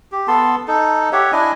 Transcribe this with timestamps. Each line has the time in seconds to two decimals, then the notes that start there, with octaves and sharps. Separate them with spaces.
0.12 G4
0.28 B3 A4 A5 C6
0.68 D#4 A4
1.13 G4 C#5 E5 F#5
1.32 D4 E4 D#5 G#5